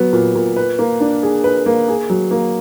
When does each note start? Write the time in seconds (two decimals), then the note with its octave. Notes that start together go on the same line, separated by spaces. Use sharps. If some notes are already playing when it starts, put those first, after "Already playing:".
Already playing: F#3 B3
0.13 A#2
0.35 A#2
0.56 B4
0.79 A#3
1.00 D4
1.23 G#4
1.44 B4
1.66 A#3
1.88 G#4
2.10 F#3
2.31 A#3